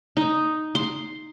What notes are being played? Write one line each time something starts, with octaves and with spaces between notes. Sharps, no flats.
D#4
C6